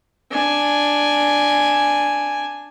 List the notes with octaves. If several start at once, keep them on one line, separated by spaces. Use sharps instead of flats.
D4 G#5